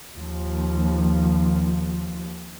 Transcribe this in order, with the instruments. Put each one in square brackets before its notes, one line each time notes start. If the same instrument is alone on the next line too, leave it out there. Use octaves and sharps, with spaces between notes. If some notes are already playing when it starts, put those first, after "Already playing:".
[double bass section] D#2 F3